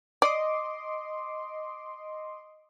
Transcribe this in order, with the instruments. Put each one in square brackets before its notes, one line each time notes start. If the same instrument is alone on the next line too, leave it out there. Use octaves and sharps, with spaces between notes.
[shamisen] D5 [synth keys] D#5 C6 D6